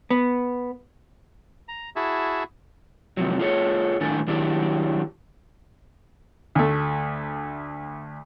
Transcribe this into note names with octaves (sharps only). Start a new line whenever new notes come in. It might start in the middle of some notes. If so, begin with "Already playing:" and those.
B3
A#5
E4 F#4 G#4 E5 A5
E2 C3 F3 F#3
F4 G#4 A4 C#5
A2 D#3 D4 A4 G#5
D#3 F#3 D4 E4 G4 D5
D2 A3